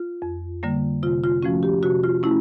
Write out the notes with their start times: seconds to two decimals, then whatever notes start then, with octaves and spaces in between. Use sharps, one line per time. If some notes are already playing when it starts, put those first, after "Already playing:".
Already playing: F4
0.22 F2
0.63 D3 G3 A#3
1.03 C3 F4
1.24 F4
1.42 F3 A3 C#4 F#4
1.63 G4
1.83 C3 F#4
2.04 F4
2.23 A3 C#4 E4